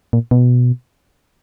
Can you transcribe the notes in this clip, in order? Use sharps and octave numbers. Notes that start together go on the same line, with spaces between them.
A#2
B2